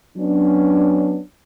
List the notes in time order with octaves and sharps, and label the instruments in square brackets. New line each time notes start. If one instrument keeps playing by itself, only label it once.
[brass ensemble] F#3 B3 C#4 D4